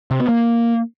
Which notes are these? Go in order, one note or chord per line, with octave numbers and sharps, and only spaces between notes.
C3
B3
A#3